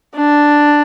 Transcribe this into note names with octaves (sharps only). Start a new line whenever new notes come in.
D4